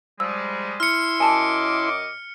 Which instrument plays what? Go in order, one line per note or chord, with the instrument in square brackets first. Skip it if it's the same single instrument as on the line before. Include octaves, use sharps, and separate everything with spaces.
[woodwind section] F3 G3 G#3 [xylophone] E6
[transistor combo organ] E4 C6 [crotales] F6 C#7
[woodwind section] F#2 D#5 D6 [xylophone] G#5 A5 E6